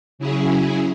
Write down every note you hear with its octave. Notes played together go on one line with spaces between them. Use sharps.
C#3 F#3 C#4 E4 G#4